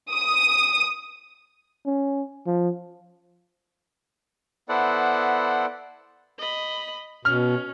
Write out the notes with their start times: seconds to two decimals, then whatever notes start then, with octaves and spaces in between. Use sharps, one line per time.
0.12 D#6
1.86 C#4
2.46 F3
4.69 B3 E4 A4 C5 D5 F#5
6.38 D#5 B5
7.25 B2 C#4 F6